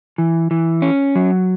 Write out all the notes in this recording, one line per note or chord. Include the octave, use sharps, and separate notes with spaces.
E3
E3
C#4
F#3